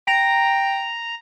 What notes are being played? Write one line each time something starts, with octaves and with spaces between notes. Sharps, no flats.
G5 A#5